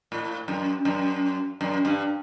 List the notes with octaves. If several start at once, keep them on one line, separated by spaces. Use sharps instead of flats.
A2
F#2
F#2
F#2
G2